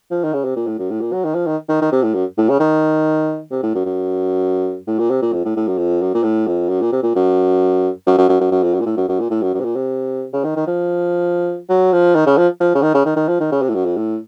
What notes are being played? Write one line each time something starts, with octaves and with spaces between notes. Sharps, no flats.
F3
D#3
C#3
C3
A#2
A2
F#2
A2
A#2
F#3
D#3
F3
D#3
D#3
D#3
C3
A2
F#2
A2
C#3
D#3
C3
A2
F#2
F#2
A2
A#2
C3
A#2
F2
A2
A2
F#2
F2
F#2
A#2
A2
F2
F#2
A#2
C3
A#2
F#2
F#2
F#2
F#2
F#2
F#2
F2
F#2
A#2
A2
F#2
F#2
A#2
A2
F#2
F#2
C3
A#2
C3
C#3
D#3
D#3
F3
F#3
F3
D#3
C#3
F3
F3
C#3
D#3
C#3
D#3
D#3
F3
D#3
C#3
C3
A2
F#2
F2
A2